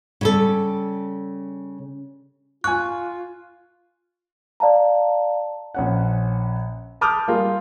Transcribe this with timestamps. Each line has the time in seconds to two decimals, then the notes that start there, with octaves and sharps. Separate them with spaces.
0.21 C#3 G3 A4
2.64 F4 G#5 C#6 F#6
4.60 D5 F5 A5 A#5
5.75 A#1 C#4 F#5
7.01 A5 B5 D6 D#6 F6 G6
7.28 G3 A#3 F4 G#4 A#4